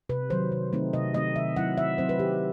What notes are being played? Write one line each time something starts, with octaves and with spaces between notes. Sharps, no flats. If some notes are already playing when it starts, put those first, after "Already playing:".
C3 B4
D#3 F#3 C5
C3
D#3 A3 C4 D#4
C3 D#5
D#3 A3 C4 D#4 D#5
D#3 E5
F#3 C4 E4 F#5
D#3 E5
F#3 C4 E4 C5
B4
D#3 G4